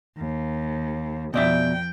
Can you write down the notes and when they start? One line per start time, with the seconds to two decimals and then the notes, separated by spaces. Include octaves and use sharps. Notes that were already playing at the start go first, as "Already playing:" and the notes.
0.18 D#2
1.34 F2 B2 D5 E5 G5